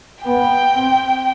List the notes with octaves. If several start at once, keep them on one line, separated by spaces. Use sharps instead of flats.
B3 G5
C4